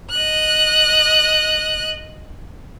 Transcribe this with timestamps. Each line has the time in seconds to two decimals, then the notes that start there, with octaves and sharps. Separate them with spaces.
0.11 D#5 F#6